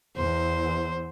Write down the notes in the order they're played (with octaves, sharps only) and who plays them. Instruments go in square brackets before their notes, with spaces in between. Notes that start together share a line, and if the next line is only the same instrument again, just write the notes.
[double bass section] E2 [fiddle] C5